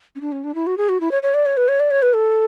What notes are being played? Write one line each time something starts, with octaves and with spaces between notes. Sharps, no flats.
C#4
D4
C#4
D4
E4
F#4
G#4
F#4
E4
C#5
C#5
D5
C#5
B4
C#5
D5
C#5
B4
A4